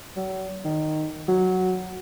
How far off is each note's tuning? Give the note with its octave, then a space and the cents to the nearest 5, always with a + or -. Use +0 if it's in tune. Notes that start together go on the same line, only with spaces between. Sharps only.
F#3 +40
D#3 -10
F#3 +0